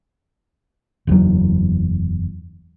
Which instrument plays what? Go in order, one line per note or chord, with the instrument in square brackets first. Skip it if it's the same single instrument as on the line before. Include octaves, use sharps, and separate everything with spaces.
[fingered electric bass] F#1 E2 A#2 F#3